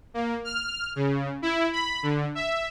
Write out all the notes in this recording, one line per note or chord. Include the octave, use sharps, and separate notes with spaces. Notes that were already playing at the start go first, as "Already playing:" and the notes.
A#3
F6
C#3
E4
B5
D3
E5